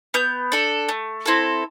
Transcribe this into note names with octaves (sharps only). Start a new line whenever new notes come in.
B3 G6
D4 A4
A3
C4 E4 A4